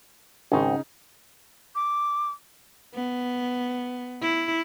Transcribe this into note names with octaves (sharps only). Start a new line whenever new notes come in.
G#1 C#3 D#4
D6
B3
E4